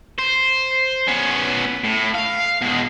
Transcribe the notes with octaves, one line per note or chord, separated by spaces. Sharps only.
C5
B3 C#4
A2
F5
B2 G#3